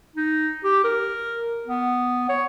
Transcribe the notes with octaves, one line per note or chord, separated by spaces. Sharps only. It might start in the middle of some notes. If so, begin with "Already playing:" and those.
D#4
G4
A#4
B3
C#5